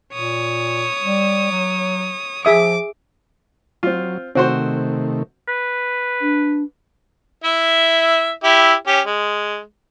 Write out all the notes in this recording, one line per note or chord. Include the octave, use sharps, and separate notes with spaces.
A#2 C#5 D#6
G3
F#3
F3 G#4 E5 D6 D#6
F#3 C4 F4
C3 D#3 A3 C4 F#4 C5
B4
D4
E4 E5
E4 G4 E5
C#4 G4
G#3